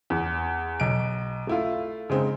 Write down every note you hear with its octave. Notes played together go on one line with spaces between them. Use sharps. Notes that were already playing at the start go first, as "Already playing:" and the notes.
E2
B1 D7
A3 E4 F4
C#3 G#3 C4 D#4